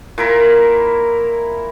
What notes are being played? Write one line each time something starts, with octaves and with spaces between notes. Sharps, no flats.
A#2 E4 A#4